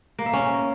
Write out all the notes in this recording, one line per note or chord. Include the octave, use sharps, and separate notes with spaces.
A#3
E5
C#4